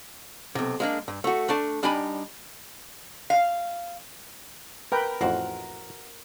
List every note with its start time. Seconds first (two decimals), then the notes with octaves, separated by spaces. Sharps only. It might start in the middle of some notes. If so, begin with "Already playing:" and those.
0.55 B1 C3
0.80 G#3 A#3 D4
1.08 G2
1.24 A3 F#4
1.49 A3 D4 A5
1.83 G3 D4 D#4 G4 G#5 B5
3.30 F5
4.92 A#4 B4 G5
5.21 A1 F2 F#4 C5 F#5